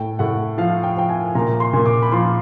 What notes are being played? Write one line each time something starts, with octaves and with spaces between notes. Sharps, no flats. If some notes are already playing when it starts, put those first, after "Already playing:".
Already playing: A2 G5
A2 F#5
F3 F5
G5
F3 G5
G#5
A#2 A#5
C6
A#2
D6
B5
F3 C6